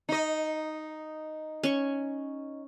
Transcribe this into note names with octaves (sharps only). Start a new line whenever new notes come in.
D#4 D#5
C#4 C#6